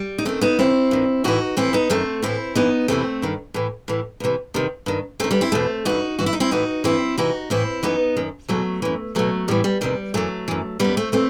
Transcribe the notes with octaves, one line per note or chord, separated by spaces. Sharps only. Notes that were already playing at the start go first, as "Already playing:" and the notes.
Already playing: G3
D#4
F#2 D#3 A3 C4
B3 D#4
F#2 D#3 C4 E4
G2 D#3
A2 E3 D#4 F#4
A2 E3 C4 E4
B3 D#4
F#2 D#3 A3 C4
A2 E3 C4 E4
G2 E3 B3 D#4
E2 C3 E3 A3 C4
G2 D#3
A2 E3
A2 E3
E2 C3 E3
E2 C3 D#3
G2 D#3
F#2 D#3 A3 C4
G3 B3
C4 E4
E2 B2 A3 C4
G2 E3 D#4 F#4
G2 E3 F#4
E4
D#4
C4 E4
A2 E3 D#4 F#4
G2 E3 C4 E4
E2 C3 E3 D#4 F#4
A2 E3 C4 E4
F#2 E3 B3 D#4
F#2 D#3
E2 B2 F#3 A3
F#2 E3
E2 B2 F#3 A3
A2 E3 G3
G3
E2 C3 D#3 G3
F#2 E3 F#3 A3
F#2 E3
F#2 E3 G3 B3
A3 C4
E3 A3 C4